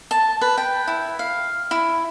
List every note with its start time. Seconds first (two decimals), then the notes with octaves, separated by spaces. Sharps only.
0.11 A5
0.41 B4
0.58 G5
0.87 E4
1.19 F5
1.71 E4